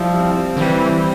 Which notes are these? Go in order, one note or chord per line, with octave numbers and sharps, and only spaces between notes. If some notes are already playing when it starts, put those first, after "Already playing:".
Already playing: F3 G3 E4
C4
D3
E3 G3